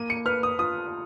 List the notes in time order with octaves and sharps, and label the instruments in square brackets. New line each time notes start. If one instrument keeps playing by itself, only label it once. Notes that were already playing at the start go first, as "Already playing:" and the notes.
Already playing: [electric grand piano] A#3 [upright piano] D#7
[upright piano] C#7
[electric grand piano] B4 [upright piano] F6
[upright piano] D#6
[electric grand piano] F4 [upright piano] D#6